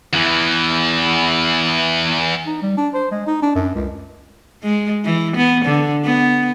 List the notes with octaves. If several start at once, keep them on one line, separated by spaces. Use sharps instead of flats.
E2 E3
D#4
G3
D4
C5
G#3
D#4
D4
F#2
C#2
G#3
E3
B3
D3
B3